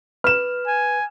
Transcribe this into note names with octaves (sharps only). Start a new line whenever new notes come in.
B4 F6 E7
G#5